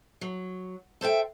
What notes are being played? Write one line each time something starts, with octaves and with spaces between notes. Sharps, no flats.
F#3
A4 C5 E5 G5